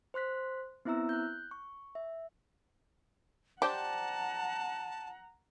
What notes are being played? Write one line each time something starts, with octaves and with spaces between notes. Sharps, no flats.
C5 C6 F#6 B6
B3 C4 E4 E5 A#5 E6
F#6 G6
C#6
E5
D4 G4 C5 F#5 G5 A5 A#5